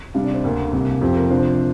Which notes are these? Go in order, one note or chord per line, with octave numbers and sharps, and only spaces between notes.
C3 G3 D4 F5
D5
C5
D2 D3 A#3 A#4
C2 C3 A#3
F2 C3 F3 C4 G4
A#4
C3 F3 D4 C5